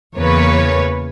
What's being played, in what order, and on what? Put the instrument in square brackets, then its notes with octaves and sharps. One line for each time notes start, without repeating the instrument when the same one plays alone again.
[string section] E2 C#3 A#3 B4 C#5